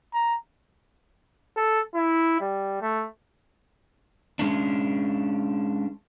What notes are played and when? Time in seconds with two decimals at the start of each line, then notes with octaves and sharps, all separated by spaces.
0.14 A#5
1.56 A4
1.95 E4
2.40 G3
2.81 A3
4.39 G#3 C#4 D4